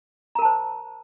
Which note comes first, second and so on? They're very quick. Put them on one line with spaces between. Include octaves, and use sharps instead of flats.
A#5 A#4 A5 C5